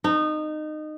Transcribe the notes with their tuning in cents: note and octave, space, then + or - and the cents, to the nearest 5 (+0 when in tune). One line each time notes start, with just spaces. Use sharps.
D#4 -20